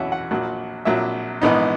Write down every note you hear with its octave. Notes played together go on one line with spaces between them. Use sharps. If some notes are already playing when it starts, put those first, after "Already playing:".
Already playing: E2 B2 F#3 C#4 E5 F#5
F#5
A#1 A#2 F#3
A#1 A#2 F#3 E5
A#1 G#2 E3 B3 D#4